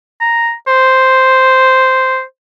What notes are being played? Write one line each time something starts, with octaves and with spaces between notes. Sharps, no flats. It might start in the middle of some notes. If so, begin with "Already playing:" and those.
A#5
C5